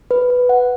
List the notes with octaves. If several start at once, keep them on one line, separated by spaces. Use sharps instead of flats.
B4
B4
F#5